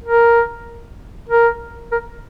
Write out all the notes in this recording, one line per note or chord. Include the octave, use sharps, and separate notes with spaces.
A#4
A#4
A#4